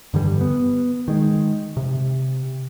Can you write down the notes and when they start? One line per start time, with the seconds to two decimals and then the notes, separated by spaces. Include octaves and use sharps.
0.14 G2 D3 E3 G3
0.41 B3
1.08 D#3 G#3
1.77 C3